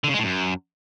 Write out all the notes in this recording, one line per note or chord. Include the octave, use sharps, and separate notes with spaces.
D3
C#3
G#3
A2
F#2